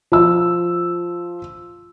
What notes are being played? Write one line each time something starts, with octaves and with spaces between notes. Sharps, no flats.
F3 E6